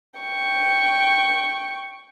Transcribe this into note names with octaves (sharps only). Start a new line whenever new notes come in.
G5 C#6